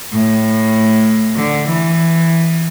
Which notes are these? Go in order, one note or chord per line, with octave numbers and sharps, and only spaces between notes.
A2
D3
E3